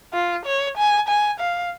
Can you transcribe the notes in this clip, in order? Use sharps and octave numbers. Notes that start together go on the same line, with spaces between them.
F4
C#5
G#5
G#5
F5